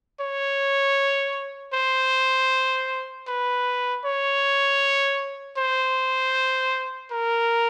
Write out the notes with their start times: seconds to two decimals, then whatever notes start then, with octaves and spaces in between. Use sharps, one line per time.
0.20 C#5
1.73 C5
3.27 B4
4.04 C#5
5.57 C5
7.11 A#4